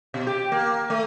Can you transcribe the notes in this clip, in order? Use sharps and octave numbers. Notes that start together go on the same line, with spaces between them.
B2
G4
A#3
A3